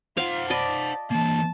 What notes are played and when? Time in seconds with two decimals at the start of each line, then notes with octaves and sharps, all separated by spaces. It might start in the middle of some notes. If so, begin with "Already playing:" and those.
0.17 F4 C5 F5 F#5
0.50 D5 D#5 A5 B5
1.11 E3 A#3 A5